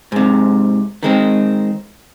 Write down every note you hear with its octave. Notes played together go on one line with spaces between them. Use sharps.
G#2 C3
D#3 G#3 C4